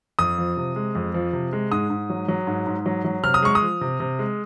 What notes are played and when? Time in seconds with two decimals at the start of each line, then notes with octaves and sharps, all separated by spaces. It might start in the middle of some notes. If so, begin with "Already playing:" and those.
0.19 F2 D#6
0.38 F3
0.57 C3
0.76 G#3
0.95 F2
1.14 F3
1.33 C3
1.53 G#3
1.71 G#2 D#6
1.90 G#2
2.10 F#3
2.28 F#3
2.47 G#2
2.67 G#2
2.86 F#3
3.04 F#3
3.23 C3 F6
3.34 D#6
3.42 G#3 C#6
3.55 D#6
3.62 F3
3.81 C3
4.00 C3
4.19 G#3